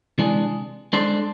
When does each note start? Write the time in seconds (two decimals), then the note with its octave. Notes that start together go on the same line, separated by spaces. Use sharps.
0.18 C3 E3 G#3 D4 G#4
0.93 G#3 D4 A4 C5